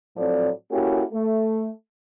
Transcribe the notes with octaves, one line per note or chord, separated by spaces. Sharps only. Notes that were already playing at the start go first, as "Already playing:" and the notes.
A2 F3 F#3 C4 A4 D5
A#3 C#4 E4 F#4 G4 A4
A3